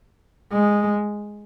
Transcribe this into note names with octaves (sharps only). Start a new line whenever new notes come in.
G#3